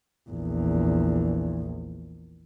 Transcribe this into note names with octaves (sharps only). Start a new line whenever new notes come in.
A#1 E2